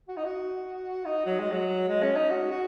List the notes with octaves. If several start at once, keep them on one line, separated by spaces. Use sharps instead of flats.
F#4
D#4
F#4
D#4
F#3
G#3
F#3
G#3
C#4
D#4
F#4
F#4